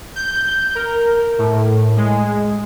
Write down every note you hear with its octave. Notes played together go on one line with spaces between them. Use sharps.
G6
A#4
A2
G#3